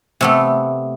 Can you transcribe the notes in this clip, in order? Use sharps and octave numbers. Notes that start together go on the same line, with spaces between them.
C3 A3 B3